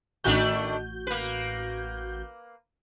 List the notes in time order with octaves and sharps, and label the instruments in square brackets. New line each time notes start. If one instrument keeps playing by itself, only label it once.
[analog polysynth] A1 F#4 G6 [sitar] D#3 A3 D4
[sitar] A#3 B4